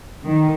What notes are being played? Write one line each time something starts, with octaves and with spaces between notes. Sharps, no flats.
D#3